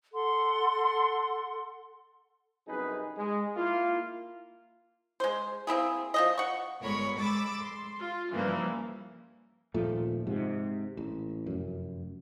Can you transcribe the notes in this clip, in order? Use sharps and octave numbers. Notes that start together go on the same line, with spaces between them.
A4 F#5 C6
C2 F#2 C4 D#4 G#4 B4
G#3
A#3 E4 F4
G#3 C5
A#3 C4 E4 G#4
F3 C4 D#5
F#5 C#6
G1 G#3 A#4 C#5 B5
G#3 B5 D6 E6 A6
C6
F4
G2 C#3 E3 F3 A#3
D#1 A#2 F3 A3
G#2 C3
A1
F1 F#2